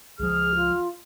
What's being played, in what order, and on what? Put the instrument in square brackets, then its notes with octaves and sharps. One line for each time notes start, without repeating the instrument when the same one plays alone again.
[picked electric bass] C#2 F3 [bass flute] G#4 [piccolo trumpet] F6
[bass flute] F4